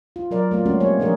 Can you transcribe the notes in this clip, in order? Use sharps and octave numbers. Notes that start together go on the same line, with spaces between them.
F4
F#3 A#4 D5
A3 A#3 F4
G#3 A3 C4 C#4 F#4
G3 A#3 C4 C#5
F3 G3 D4 G#4 A#4